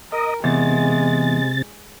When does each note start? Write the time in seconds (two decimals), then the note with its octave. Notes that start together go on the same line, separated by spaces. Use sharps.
0.12 A#4 D#5
0.44 E2 C3 G#3 A6